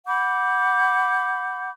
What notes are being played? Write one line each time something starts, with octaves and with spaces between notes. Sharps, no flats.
F#5 B5 D6 G6